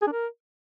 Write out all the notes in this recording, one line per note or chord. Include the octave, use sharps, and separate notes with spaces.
G#4
D4
A#4